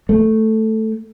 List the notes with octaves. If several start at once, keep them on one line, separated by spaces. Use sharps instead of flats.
A3